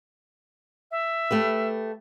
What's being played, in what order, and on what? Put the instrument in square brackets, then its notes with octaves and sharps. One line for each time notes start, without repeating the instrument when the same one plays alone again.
[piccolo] E5
[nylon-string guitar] A3 G4 B4